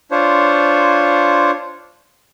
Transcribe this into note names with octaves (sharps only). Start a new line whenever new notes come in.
D4 F4 C5 C#5